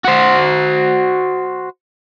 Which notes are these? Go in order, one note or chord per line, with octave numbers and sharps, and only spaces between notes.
F#4 C5